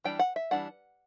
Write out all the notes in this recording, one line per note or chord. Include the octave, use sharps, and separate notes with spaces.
E3 G3 D4 G5
F#5
E5
E3 G3 D4 F#5